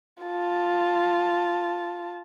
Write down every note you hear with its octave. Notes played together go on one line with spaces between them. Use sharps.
F4 A5